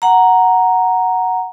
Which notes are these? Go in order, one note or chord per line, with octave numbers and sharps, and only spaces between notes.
F#5 A#5